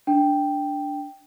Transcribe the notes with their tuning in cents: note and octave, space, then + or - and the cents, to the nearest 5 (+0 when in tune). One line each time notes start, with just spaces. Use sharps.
D4 -5 G5 +0